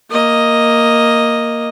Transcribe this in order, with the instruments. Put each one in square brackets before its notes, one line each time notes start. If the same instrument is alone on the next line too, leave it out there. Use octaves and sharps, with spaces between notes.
[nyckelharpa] A#3 D#5